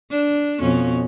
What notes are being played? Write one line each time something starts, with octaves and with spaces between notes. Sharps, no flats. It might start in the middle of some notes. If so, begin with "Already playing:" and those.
D4
F2 B2 C#4